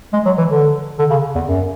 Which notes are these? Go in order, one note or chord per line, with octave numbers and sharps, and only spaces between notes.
G#3
F#3
E3
D3
D3
C#3
E2
F#2